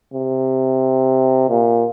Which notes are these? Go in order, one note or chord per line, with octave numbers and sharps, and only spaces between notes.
C3
A#2